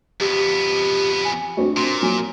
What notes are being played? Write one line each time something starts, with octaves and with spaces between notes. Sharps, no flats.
F2 B3 G4
G#5
A3 C4 D4 F#4
A#2 C6
F#3 A#3 G#5